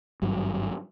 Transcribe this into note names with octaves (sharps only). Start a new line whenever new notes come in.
G#1 G2 F#3